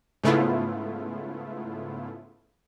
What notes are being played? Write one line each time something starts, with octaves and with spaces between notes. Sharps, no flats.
G#2 C#3 A3 B3 E4 F4